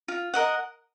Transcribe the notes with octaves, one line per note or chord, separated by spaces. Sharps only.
F4
A#4 D#5 F#5